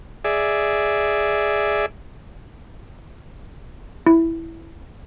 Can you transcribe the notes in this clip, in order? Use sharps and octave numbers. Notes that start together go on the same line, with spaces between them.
G#4 D5 E5
E4